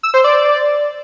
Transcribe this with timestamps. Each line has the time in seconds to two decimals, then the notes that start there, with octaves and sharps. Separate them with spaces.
0.03 E6
0.14 C5
0.24 D5